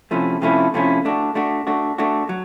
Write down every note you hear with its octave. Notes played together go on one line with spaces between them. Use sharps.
C3 F3 A3 C#4 E4
C3 F3 A3 C#4 E4
C3 F3 A3 C#4 E4
A3 D4 F#4
A3 D4 F#4
A3 D4 F#4
A3 D4 F#4
F#3